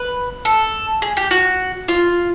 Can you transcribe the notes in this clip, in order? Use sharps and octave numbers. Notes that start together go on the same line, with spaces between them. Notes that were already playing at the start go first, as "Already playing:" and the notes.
Already playing: B4
A4
G#4
G4
F#4
F4